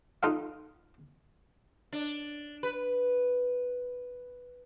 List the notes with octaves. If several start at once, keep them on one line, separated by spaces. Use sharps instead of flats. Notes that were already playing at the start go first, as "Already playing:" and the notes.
D#4 F4 A4 F5
D4
B4